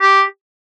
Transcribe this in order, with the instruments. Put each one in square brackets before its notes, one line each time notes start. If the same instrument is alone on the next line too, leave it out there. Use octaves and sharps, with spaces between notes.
[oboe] G4